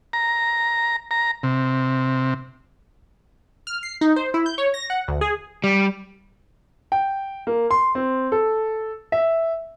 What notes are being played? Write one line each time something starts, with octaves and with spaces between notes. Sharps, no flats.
A#5
A#5
C3
F6
C7
D#4
C5
E4
G6
C#5
A#6
F#5
D2
G#4
G3
G5
A#3
C6
C4
A4
E5